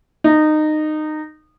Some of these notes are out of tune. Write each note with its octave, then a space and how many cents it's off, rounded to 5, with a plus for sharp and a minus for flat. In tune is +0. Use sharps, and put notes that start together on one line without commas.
D#4 -20